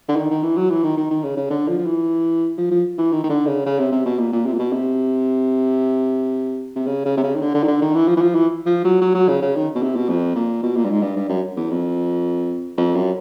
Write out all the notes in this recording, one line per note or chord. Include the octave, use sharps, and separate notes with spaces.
D3
D#3
D#3
E3
F#3
E3
D#3
D#3
D#3
C#3
C#3
D3
F3
F3
E3
F3
F3
E3
D#3
D#3
D3
C#3
C#3
C3
C3
B2
A#2
A#2
C3
A#2
B2
C3
C3
C#3
C#3
C3
C#3
D#3
D3
D3
D#3
D3
D#3
E3
F3
E3
F3
E3
F3
F#3
F#3
F#3
C#3
C#3
D#3
B2
C3
B2
F2
A#2
B2
A#2
G2
G#2
G2
G2
F#2
E2
F2
F2
F#2